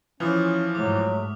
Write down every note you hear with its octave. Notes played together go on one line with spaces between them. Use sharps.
E3 F3 C#4 D#6 F6 F7
G#2 F#3 A3 D6